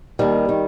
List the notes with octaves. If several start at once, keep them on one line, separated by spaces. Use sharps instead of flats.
D#2 D#3 G3
D#3